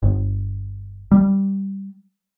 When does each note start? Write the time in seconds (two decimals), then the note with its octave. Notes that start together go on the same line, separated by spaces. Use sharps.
0.03 G1
1.12 G3